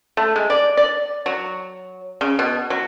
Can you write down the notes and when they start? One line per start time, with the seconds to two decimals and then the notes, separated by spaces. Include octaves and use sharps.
0.17 A3
0.36 G#3
0.50 D5
0.77 D5
1.26 F#3
2.21 C#3
2.39 B2
2.70 F#3